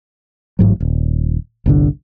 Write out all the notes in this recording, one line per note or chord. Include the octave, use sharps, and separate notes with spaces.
A1 G#2 F#3
D#1
G1 C2 D3